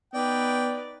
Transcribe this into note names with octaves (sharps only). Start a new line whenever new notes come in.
B3 D#4 B4 D5 G5